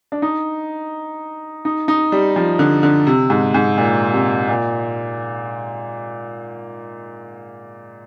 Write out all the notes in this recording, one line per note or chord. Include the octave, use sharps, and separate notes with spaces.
D4
D#4
D#4
D#4
G3
F3
D3
D3
C3
G#2
G#2
A#2
C3
A#2